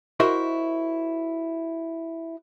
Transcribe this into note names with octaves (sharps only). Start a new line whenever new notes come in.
E4 F#4 A#4 C5 D#5 E5